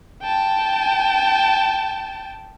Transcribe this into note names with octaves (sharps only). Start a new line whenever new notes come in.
G5 A5